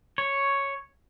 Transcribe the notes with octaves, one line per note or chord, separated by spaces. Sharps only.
C#5